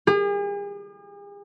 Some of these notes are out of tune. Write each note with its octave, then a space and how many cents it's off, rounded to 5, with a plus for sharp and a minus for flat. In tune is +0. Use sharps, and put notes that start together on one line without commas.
G#4 -45